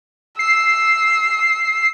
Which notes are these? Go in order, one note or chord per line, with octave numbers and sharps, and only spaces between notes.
E6 C7